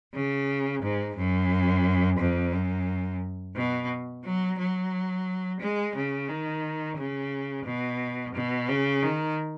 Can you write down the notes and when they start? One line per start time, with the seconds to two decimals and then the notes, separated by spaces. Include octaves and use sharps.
0.14 C#3
0.83 G#2
1.17 F#2
2.20 F2
2.53 F#2
3.56 B2
4.25 F#3
4.59 F#3
5.60 G#3
5.95 C#3
6.29 D#3
6.98 C#3
7.65 B2
8.35 B2
8.69 C#3
9.03 D#3